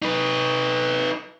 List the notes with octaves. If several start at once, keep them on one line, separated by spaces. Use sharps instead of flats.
D#4 B4